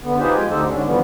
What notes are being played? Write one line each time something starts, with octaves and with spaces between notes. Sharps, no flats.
D3 B3
D#4 F4 G4 G#4 B4 C5
F2 G#3 F4 G5 G#5
D2 D3 D#4 G4 A4 C5
G#2 D3 C#4 D4
D3 E3 F3 G3 B3